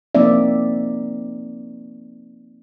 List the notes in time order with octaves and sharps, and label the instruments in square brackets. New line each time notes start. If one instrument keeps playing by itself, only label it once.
[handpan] F3 A#3 C4 D#4 D5 E5